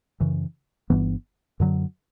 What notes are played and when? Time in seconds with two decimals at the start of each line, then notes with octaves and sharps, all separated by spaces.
0.20 F#2 C#3 E3
0.90 G1 G2 E3 B3
1.60 F#2 D3 F#3